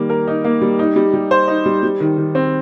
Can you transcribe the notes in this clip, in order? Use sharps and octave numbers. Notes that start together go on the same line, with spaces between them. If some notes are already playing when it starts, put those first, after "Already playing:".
Already playing: D#3 G3 A#3
A#4
D#4
A#3
G3
D#4
G3
G3
C5
D#4
G3
G3
D#3
D#3
C4